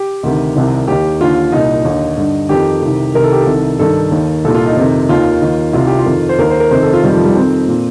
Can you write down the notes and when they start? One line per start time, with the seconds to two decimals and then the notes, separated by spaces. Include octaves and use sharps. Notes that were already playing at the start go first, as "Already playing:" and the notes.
Already playing: G4
0.23 D2 C3 D#3
0.56 C2 C3 D#3
0.88 D#2 D#3 G4
1.20 D#2 D3 F4
1.52 C2 A#2 D#4
1.85 D#2 D3
2.17 G2 D3
2.49 F2 D#3 G4
2.82 C2 C3 D#3
3.14 C2 C3 D#3 A#4
3.24 A4
3.33 G4
3.41 A4
3.47 C2 C3 D#3
3.79 G2 D#3 A4
4.11 D#2 D#3
4.45 C2 A#2 A4
4.54 F4
4.66 D#4
4.77 F2 C3 D#3
5.09 D#2 D#3 F4
5.42 D#2 D#3
5.73 C2 C3 D#3 F4
5.87 G4
5.99 F4
6.06 F2 D#3
6.29 C5
6.38 D#2 D#3 A#4
6.50 C5
6.60 A#4
6.71 F2 C3 D#3 C5
6.82 A4
6.93 F4
7.03 F2 C3 D#3 G3
7.14 F3
7.25 G3
7.35 F2 D#3 C4
7.68 A#2